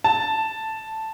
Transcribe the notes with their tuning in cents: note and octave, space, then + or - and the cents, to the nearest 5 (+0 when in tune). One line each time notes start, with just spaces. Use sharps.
A5 +0